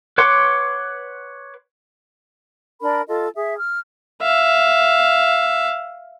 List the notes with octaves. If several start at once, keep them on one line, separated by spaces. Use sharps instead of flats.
B4 C#5 F#5 C6 D6
D4 A#4 B5
F4 A4 D#5
G#4 E5
F6
E5 F5